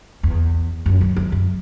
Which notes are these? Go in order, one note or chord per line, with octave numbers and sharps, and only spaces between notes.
E2
F#2
F#2
E2
F#2